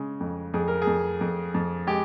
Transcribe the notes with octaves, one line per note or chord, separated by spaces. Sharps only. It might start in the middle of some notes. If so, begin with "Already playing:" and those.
Already playing: C#3 G#3
F2
F2 G#4
A#4
G#4
F2
F2
F2
G#3 G4